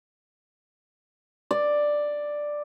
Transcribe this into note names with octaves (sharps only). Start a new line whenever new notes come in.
D5